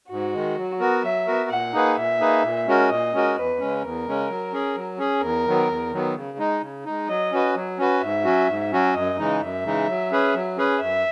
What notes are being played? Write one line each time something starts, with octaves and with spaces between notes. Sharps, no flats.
G#2 F#4
D#3 G#3
F#3
B3 F#4 A#4
F#3 E5
B3 F#4 A#4
A#2 F#5
A#3 D#4 G#4 B4
A#2 E5
A#3 D#4 G#4 B4
A#2
G#3 C#4 F#4 A#4
A#2 D#5
G#3 C#4 F#4 A#4
E2 B4
C#3 G#3 C#4
E2 A#4
C#3 G#3 C#4
F#3
C#4 G#4
F#3
C#4 G#4
E2 A#4
D#3 F#3 B3
E2
D#3 F#3 B3
C#3
G#3 D#4
C#3
G#3 D#4
F#3 D#5
C#4 F#4 B4
F#3
C#4 F#4 B4
G#2 E5
F#3 C#4 F#4
G#2
F#3 C#4 F#4
F#2 D#5
C#3 E3 G#3 D#4
F#2 E5
C#3 E3 G#3 D#4
F#3
C#4 G#4 B4
F#3
C#4 G#4 B4
F#2 E5